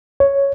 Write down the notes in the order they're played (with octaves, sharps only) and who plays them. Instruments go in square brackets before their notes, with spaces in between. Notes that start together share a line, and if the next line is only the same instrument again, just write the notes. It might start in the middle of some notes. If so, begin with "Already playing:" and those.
[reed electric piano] C#5